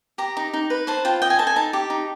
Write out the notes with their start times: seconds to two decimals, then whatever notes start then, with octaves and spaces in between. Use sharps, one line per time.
0.18 G4 A#5
0.37 D#4
0.53 D#4
0.70 B4
0.87 C5 A5
1.05 F4 G5
1.22 D#5 G5
1.30 G#5
1.39 A4 A5
1.47 G#5
1.56 D#4 A5
1.73 G4
1.90 D#4